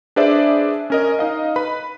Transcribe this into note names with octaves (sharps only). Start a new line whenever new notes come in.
D4 G#4 B4 C5 D5 E5
C#4 A#4 D#5
D#4 D#5 F5
B4 B5